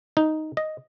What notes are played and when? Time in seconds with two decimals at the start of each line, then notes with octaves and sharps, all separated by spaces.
0.17 D#4
0.57 D#5